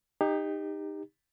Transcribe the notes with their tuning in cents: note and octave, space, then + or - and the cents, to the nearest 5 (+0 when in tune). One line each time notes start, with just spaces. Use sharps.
D#4 -10 G4 +25